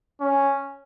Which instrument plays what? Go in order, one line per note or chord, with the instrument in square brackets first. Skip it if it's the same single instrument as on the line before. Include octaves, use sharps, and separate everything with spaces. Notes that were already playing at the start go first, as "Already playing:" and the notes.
[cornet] C#4